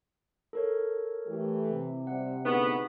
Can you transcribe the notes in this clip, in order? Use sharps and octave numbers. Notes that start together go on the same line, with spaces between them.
A4 A#4 C#5
E3 A3 G4
C3
G3 C4 E4 F#5
D2 B3 D#4 G#4 B4 C#6